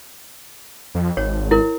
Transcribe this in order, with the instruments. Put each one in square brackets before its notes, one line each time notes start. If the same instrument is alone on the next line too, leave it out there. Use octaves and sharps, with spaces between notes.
[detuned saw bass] F2
[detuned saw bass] G#1 [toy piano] C#5
[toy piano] E4 A#4